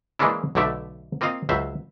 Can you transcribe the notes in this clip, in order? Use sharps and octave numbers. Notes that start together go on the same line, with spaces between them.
E3 G#3 A#3 C#4 D4 E4
B1 B2 D3 A3 D5 E5
A#3 C4 F4 D#5 F5
C#2 F#3 C5 E5